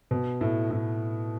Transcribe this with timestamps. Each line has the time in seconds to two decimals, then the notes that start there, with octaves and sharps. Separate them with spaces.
0.11 B2
0.41 A2
0.71 A2